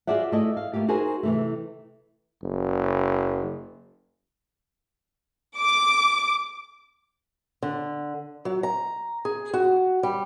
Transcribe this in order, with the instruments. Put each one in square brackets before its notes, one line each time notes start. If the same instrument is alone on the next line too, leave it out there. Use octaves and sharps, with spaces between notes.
[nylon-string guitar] F4 F#4 G#4 D5 E5 F#5
A3 E4 F#4 A4 D5 D#5
F5
A3 A#3 F4 G4
D#4 F#4 G#4 A#4 C5 G#5
C3 E3 A3
[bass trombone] F#1
[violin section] D6
[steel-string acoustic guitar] D3
F#3
A#5
G#4
F#4
G3